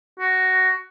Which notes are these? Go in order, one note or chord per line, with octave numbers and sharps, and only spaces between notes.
F#4